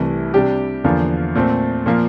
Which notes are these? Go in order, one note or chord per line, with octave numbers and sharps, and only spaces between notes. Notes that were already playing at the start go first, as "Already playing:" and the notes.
Already playing: C2 C3 E3 A3
C3 G3 D4 G4
E2 D3 F3 A#3
A#2 A3 C4
A#2 F3 A#3